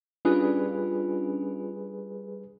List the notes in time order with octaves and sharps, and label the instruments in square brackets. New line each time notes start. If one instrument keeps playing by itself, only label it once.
[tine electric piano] G3 G#4 B4 [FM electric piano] C#4 D4 F4